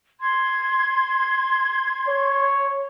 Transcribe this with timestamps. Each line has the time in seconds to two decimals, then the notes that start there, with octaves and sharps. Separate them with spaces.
0.20 C6 G#6
2.08 C#5